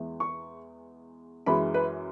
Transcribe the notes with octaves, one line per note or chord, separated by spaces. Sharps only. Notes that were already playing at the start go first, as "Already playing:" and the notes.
Already playing: E2 E3 G#3
C#6
F#2 E3 G#3 B5
B4